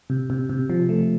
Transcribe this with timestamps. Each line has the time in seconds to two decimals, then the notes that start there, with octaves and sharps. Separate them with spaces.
0.10 C3
0.30 C3
0.49 C3
0.70 F3
0.89 A3